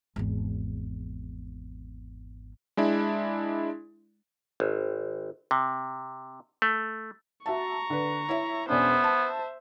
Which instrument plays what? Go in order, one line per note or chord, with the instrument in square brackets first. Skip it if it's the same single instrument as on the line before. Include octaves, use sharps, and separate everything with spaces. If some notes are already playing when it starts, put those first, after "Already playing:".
[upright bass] G#1 E2
[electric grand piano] G#3 D4 E4
[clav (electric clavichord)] G#1
C3
A3
[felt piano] F#4 E5 A5 [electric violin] A#5 C#6
[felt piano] D3 B4
E4 C#5 E5
[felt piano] E1 C#4 D4 [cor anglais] B3 [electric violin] C5 E5
[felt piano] A5